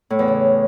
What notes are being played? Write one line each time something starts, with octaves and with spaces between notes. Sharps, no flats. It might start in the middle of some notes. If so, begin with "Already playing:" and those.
A2
E2
C#3